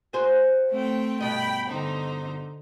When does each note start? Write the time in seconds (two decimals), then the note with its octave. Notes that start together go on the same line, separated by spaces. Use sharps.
0.13 F#4 G#4 C5
0.70 A3 C4 G5
1.21 G2 B2 D#5 G5 B5
1.69 D3 D#4 C5